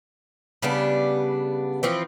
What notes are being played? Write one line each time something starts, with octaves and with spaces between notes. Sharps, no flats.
C#3 G3 B3 D4
E3 F3 C4